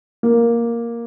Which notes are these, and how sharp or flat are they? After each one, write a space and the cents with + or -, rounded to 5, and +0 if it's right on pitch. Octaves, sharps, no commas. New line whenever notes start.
A#3 +5